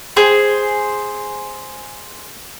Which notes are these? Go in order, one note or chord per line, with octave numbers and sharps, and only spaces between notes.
G#4 C5